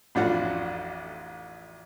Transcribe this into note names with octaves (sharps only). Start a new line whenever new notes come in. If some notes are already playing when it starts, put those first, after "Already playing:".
A1 F2 D4 F4 F#4 F#5